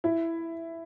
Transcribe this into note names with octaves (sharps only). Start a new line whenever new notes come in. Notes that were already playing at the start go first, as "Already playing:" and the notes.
E4